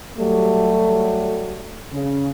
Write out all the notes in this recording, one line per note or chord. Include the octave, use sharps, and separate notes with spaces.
F#3 G3 A3
C#3